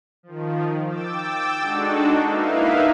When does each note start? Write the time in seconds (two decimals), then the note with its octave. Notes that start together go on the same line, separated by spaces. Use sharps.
0.23 D#3 F3
0.88 G5 D6 E6 A6
1.59 G#3 D4 D#4 F#4 A4
2.26 A#3 D#4 E4 B4 E5 F5